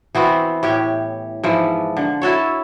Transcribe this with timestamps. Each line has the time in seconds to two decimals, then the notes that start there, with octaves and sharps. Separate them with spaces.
0.15 E3 B3 C4 F#4
0.63 A2 G4 C#5
1.44 G#2 E3 F3
1.97 D3
2.22 E4 F#4 A4 C#5